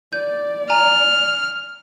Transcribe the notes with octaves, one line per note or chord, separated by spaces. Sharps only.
D5 G6
G#5 A#5 F6